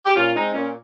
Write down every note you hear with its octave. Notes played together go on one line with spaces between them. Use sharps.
G4
A#2 C#4 F4
G#3 C4 D#4
A#2 C#4